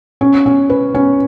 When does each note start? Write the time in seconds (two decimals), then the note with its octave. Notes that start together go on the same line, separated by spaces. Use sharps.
0.21 C#4
0.46 C#4
0.70 B4
0.95 C#4